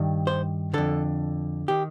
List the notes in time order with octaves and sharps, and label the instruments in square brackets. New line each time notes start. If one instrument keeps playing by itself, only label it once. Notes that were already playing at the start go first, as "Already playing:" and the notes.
Already playing: [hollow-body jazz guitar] G2 D#3
C5
F2 D3 A4
D#3 G4